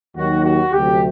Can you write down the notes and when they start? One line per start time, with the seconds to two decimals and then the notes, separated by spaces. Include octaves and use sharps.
0.17 D#2 D#3 F#3 F#4
0.45 F#4
0.73 D2 C3 F#3 G4